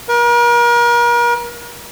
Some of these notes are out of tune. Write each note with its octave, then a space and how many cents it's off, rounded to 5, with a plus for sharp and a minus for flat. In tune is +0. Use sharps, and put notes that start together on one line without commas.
A#4 +40